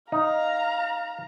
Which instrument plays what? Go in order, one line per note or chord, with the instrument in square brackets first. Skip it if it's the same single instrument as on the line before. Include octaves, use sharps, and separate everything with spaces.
[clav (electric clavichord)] D#4 [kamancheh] F5 A#5